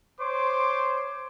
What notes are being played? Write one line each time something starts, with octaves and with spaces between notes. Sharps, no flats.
C5 C#5 C6 D6